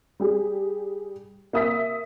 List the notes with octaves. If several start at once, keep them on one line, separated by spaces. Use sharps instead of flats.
G3 G4 G#4
A#3 E5 D#6 E6 B6